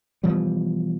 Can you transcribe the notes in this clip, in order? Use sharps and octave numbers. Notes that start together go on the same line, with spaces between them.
B2 E3 F3 G3